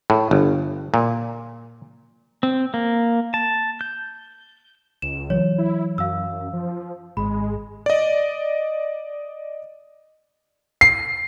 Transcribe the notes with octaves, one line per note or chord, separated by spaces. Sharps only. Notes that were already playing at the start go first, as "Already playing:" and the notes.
A2
G1
A#2
C4
A#3
A5
G6
C#2 E7
E3 F#3 C#5
E4
F#2 F5 E6
F3
G#1 G#3 B5
D5 D#5
C7